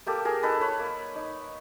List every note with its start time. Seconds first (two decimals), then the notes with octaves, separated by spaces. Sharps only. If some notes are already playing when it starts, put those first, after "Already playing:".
0.06 A#3 G4 A4
0.25 G#4 A#4
0.43 D#4 A4 B4
0.61 B4 C#5
0.79 A#3
1.16 D#4